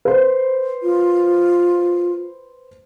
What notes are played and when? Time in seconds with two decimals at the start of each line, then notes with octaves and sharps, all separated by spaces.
0.05 B4 C5
0.83 F4